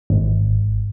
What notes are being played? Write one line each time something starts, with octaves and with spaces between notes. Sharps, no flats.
G#1